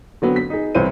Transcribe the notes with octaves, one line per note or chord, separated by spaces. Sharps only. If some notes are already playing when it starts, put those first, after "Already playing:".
D3 F#3 B3 C4
B6
D#4 G#4
C2 E3 C5 C#5 D#7